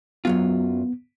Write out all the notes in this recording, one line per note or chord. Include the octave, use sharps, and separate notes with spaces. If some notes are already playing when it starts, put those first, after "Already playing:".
F#2 F#3 B3 F4